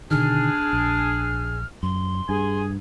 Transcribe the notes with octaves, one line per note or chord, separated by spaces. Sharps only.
B2 D3 D#3 D4 G#4 F6
A#1
F#2 C6
G2 G#4 G#5